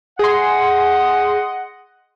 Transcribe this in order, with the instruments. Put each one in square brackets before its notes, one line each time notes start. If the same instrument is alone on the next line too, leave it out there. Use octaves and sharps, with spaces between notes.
[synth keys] G#4 C6 [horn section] D#5 F#5